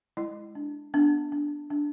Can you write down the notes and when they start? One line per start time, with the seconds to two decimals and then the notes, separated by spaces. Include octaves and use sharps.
0.17 G#3 E4
0.55 D4
0.94 B3 D4
1.32 D4
1.71 D4